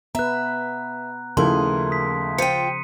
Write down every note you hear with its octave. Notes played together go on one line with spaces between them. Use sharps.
B3 B4 E5 A#5 F#6
D#2 C#3 F3 A3 E4 G#4 A#4 C6
D#6 B6
F4 C5 G5 C#7 D#7